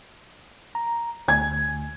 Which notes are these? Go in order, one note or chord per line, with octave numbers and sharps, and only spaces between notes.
A#5
D2 G#5 G#6